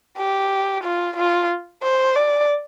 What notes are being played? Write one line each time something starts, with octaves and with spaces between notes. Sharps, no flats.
G4
F4
F4
C5
D5